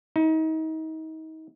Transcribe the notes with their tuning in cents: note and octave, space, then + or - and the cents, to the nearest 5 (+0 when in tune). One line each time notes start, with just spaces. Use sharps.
D#4 +35